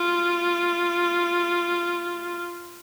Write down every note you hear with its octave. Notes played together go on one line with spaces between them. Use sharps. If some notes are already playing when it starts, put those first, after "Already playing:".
Already playing: F4